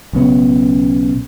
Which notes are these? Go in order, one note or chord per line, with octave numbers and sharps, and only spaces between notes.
B1 C#3 B3 C#4